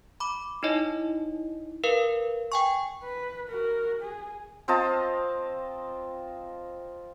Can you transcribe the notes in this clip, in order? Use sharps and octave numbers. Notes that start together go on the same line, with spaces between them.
B5 D6
D#4 E4 C#5 D#5
A#4 B4 F5
G5 G#5 C#6
B4
F#4 A#4
G#4
C4 F4 D#5 A5